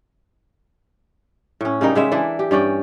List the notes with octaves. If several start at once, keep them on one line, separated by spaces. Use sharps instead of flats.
A2 C#4
C#3 G3 D#4 A#4
C#3 G#3 E5
E3 D4 E4
G4
G2 C#4 D5 G5